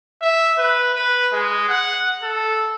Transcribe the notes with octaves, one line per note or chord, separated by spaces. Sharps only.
E5
B4
B4
G#3
F#5
A4